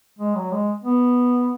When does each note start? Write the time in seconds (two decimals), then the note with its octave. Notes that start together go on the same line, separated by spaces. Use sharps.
0.19 G#3
0.35 F#3
0.52 G#3
0.84 B3